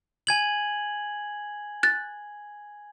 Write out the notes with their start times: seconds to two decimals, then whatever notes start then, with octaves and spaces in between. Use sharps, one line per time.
0.27 G#5 G#6 F#7
1.83 F#6 A6